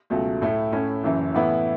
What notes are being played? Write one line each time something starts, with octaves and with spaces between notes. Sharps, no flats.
C#2 B2 F#3 A3
A2 A3 E4
A2 A3 C#4 E4
F#1 F#2 E3
A2 E3 B3 E4